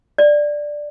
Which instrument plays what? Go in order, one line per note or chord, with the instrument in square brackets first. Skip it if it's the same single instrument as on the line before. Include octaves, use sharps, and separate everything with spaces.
[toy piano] D5